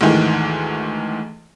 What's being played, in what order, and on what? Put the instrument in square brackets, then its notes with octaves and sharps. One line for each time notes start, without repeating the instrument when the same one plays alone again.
[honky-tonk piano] D2 G#2 D#3 E3